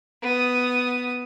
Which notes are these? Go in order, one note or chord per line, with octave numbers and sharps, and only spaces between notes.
B3 D#6